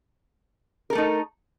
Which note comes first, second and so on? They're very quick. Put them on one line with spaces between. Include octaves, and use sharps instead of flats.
A#4 A4 A3 D#4